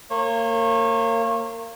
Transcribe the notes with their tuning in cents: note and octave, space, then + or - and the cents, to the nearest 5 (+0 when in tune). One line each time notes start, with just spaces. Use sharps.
A#3 -25 C#5 -30